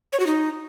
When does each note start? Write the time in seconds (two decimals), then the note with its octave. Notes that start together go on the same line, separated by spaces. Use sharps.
0.13 C#5
0.20 F#4
0.27 D#4